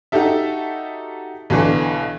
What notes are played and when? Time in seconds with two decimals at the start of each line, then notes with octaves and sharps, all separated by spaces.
0.12 D#4 F#4 G4 A4 E5
1.50 B1 B2 D3 E3